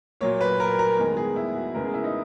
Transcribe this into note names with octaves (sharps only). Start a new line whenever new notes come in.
A#2 F#3 A#3 C#5
B4
A#4
A#4
E2 D#3 G#3 B3
G#4
E4
F#4
E2 C#3 G#3 B3 A#4
G#4
E4
D#4